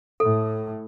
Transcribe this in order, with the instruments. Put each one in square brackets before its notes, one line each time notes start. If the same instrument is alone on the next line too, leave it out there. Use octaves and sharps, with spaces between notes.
[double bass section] A2 [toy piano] A4